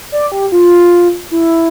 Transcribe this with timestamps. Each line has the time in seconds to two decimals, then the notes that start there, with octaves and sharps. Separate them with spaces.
0.12 D5
0.32 G4
0.52 F4
1.31 E4